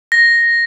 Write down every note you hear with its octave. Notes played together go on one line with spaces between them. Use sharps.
A#6